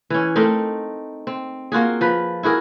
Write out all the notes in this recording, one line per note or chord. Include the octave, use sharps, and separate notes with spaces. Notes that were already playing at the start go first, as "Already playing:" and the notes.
E3 C#4
A3 C4 D#4 A#4
C4
A#3 F4 F#4 G#4
F3 B4
E4 F#4 G#4 A#4